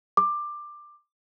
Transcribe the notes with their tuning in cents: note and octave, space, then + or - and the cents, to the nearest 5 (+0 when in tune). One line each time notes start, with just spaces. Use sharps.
D6 +15